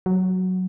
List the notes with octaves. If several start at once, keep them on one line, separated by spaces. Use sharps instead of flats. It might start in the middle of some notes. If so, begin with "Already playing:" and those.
F#3